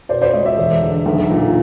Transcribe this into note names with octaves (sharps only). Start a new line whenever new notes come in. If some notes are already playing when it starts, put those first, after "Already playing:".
B2 C5 D5
C5 D5
C#2 C#5 D#5
D5 E5
E1
D3
B1
A#2